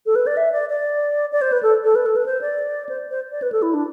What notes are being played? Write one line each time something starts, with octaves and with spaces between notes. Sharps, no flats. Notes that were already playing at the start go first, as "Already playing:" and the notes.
A4
B4
D5
E5
D5
D5
D5
C5
B4
A4
A4
B4
A4
B4
C5
D5
C5
C5
D5
B4
A4
E4
D4